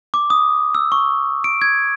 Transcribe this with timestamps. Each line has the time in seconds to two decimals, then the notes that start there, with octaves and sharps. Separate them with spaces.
0.14 D6
0.30 D#6
0.75 E6
0.92 C#6
1.44 D7
1.62 G#6